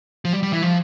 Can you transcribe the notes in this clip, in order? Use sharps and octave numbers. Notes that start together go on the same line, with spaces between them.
F3
G3
G3
E3
F3